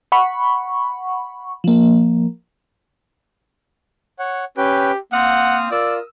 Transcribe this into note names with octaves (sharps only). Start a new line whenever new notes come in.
F#5 B5 C#6
F3 A#3
C#5 F#5
C#4 G4 B4 G5
A#3 C4 F#5 D#6 F6
F4 A#4 D5 D#6 E6